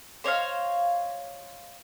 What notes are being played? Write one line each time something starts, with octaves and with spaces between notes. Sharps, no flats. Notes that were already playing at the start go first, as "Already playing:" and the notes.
C5 C#5 D#5 F5